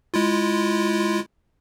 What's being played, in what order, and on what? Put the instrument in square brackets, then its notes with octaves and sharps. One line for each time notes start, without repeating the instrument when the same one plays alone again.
[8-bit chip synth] G#3 E4 F4